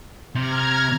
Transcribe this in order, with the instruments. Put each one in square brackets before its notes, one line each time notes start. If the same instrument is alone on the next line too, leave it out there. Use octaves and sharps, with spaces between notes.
[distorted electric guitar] C3 [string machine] A#5 F6 G#6